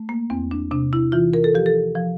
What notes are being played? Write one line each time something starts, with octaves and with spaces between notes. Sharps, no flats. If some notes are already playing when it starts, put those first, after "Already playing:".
Already playing: A3
A#3
E2 C4
D4
C3 D4
E4
E3 F4
A#4
A4
F3 G4
A4
F3